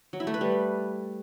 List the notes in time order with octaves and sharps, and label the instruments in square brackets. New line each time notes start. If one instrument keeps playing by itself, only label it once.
[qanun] F#3
E4
A3
B4
G3